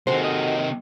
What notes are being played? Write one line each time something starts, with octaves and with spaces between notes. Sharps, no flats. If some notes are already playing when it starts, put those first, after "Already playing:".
C3 D#3 F#4 G#4 A4 C5
D#5